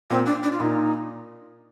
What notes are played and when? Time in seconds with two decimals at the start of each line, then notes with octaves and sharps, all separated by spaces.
0.10 A#2 C4
0.26 D4
0.43 D4
0.52 F4
0.60 A#2 D#4